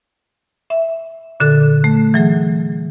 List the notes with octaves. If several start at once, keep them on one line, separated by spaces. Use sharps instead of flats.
E5
A#2 D3 A4 F#6
A3
E3 F#3 G#4